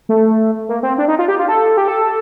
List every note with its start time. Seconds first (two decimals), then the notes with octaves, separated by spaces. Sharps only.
0.09 A3
0.69 A#3
0.83 C4
0.98 D4
1.08 D#4
1.19 F4
1.28 G4
1.39 F4
1.48 A4
1.77 G4
1.88 A4